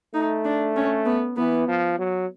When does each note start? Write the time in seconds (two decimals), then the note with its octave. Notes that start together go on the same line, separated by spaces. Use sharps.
0.14 A3 D#4
0.45 D4
0.76 C#4
1.06 B3
1.37 E3 B3
1.68 F3
1.99 F#3